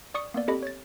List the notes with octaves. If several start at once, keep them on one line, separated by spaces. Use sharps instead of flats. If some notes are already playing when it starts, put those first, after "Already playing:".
D5 C#6 D#6 C#7
A#3 B3 D5
C4 G4 A4 D#5 B5
C#5 A6